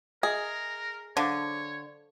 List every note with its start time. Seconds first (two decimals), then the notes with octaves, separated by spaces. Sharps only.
0.23 G#4 A#4 D#5 E5
1.17 D3 C5 C#5 F5 D6